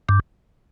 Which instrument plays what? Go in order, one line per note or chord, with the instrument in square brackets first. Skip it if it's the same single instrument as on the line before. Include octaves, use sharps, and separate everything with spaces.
[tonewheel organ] G2